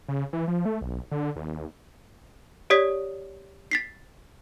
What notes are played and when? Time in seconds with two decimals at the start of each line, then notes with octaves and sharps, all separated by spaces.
0.08 C#3
0.33 E3
0.48 F3
0.65 A3
0.81 B1
1.11 D3
1.36 D#2
2.70 G4 C#5 D5 D#6 G#6 B6
3.71 A6 B6 C7